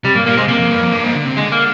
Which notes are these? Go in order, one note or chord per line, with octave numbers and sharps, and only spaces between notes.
C3 G3
G2 A#3
A#2 A#3
C3 G#3
C3 A#3
F2
G2
F2
G2
G#2
D3
C3
D3 G#3
A#3